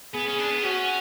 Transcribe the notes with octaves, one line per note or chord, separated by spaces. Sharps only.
B3 G#4
C#4
D4
B3
C#4 F#4